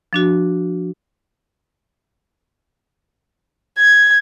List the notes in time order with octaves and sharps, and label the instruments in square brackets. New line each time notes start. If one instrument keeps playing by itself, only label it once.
[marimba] F3 D4 F#4
[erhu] G#6